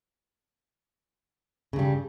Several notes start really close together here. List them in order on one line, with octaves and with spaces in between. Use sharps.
C#3 G2 G3